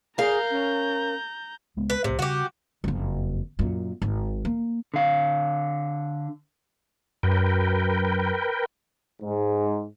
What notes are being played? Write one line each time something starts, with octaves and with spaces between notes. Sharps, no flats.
G#4 A#4 F5 A#5 G6
C#4
C#2 G#3 B3
B4
C2 A2 C3
C#3 G3 F#4 G4
F#1 F2
F#2 A#2
G#1
A#3
D3 F5
F#2 A#4 B4 G5
G#2